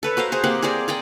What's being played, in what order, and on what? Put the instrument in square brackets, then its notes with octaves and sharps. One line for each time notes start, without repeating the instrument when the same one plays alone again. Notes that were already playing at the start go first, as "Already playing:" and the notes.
[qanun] A4 B4 C#5
F#4 A#4 C5 F5
G#4 C5
A#3 C4 G4 F#5
G#4 A#4 C5 D5
A#4 D5 D#5 G5